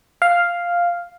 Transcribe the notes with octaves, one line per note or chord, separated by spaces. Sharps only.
F5